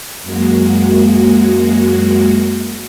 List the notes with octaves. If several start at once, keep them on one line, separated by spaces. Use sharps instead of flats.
F#2 G#3 A#3 F#4